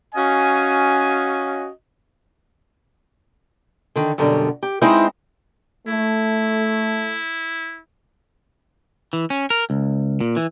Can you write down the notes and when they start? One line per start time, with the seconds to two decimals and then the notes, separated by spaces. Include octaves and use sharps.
0.14 C#4 F#4 D#5 F5 G#5
3.96 D3 D#3
4.18 F#2 B2 D3 G3
4.63 G4
4.82 G#3 C4 D#4 E4 C5
5.88 A3 E4
9.13 E3
9.30 C#4
9.50 A#4
9.70 C#2
10.20 A#2
10.36 E3